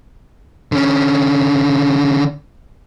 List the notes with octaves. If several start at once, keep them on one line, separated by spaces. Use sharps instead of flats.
D3 C#4